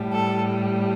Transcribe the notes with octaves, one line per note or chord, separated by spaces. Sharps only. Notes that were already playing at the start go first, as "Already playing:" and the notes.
Already playing: A2 G3
A4